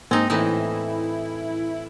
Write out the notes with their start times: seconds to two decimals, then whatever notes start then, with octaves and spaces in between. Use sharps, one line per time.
0.11 G#2 A#3 C4 D#4
0.30 A2 E3 D#4 E4